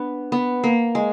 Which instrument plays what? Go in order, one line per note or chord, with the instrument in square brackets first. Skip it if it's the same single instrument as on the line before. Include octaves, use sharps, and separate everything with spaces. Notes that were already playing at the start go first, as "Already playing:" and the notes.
Already playing: [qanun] B3 D4
B3
A#3
G#3